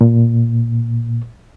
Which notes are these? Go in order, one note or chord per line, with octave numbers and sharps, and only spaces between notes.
A#2